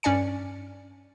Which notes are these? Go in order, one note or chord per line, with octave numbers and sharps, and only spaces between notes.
G2 C#4 D5 G#5 C#7